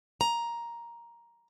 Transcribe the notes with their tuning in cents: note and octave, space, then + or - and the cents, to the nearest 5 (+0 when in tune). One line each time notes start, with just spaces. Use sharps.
A#5 +10